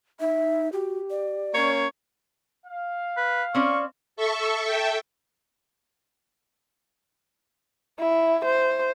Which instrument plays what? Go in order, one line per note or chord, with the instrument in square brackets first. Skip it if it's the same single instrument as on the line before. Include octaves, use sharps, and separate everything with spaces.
[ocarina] D#4 [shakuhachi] E5
[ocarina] F#4 [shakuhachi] G4
[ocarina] D5
[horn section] A#3 C#4 C#5
[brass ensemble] F5
[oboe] B4
[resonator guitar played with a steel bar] C4 C#4 D5 [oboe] C#6
[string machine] A4 E5 C#6
A4 E5 G5
[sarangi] E4
C5